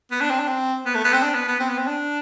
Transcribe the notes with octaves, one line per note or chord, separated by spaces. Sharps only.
B3
D4
C4
D4
C4
B3
A3
B3
C4
D4
B3
B3
C4
B3
C4
D4